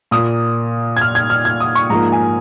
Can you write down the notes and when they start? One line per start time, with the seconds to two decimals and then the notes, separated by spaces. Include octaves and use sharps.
0.11 A#2 A#3 D#6
0.97 G#6
1.01 F6
1.15 G#6
1.30 F6
1.45 G#6
1.60 D#6
1.75 C#6
1.89 G#2 F3 A#3 A#5
2.12 G#5